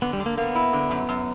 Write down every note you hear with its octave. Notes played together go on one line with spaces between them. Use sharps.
D3 B3
G3
D3
A#3
A#3 B3
E4
D3
F#2
F#2